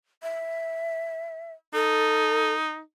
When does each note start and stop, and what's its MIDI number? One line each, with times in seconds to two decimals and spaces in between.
0.23 1.52 76
1.74 2.80 63
1.74 2.53 69